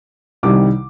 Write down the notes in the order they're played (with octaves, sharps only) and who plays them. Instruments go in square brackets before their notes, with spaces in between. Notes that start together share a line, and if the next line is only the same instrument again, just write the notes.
[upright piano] C2 C3 D#3 G3 D6